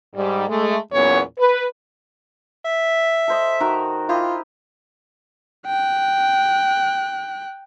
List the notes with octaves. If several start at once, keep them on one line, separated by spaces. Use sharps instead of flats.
G#2 G3
G#3 A3
E2 A#2 F#3 B3 C#4 C#5
B4
E5
A4 C5 D#5
D#3 F#4 A#4
E4 F4 G4 D#5
G5 F#6